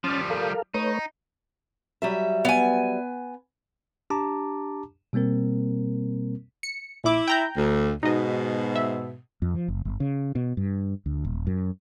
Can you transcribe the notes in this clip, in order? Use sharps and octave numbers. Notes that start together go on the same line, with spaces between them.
F3 G3 C#4 F6 A6
A4 A#4 F5
A3 D#4 B4 C#5
F#3 G3 E5
B3 G#5
D4 G4 A5 A#5 D6
B2 G3 A#3 C4 A#4
C#7
A#1 E4 D6
G5 A#5 G6
D2
G#2 B2 D#4 D#5
E5
F2
F3
F#1
G1
C#3
B2
G2
D2
D#1
F#2